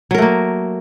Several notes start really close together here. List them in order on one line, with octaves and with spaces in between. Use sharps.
F#3 A#4 A3 A#3